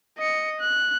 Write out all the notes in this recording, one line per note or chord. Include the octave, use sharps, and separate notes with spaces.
D#5 C#7
F#6